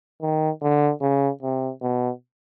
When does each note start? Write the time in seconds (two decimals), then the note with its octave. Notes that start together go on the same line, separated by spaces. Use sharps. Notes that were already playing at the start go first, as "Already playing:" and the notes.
0.22 D#3
0.62 D3
1.01 C#3
1.43 C3
1.82 B2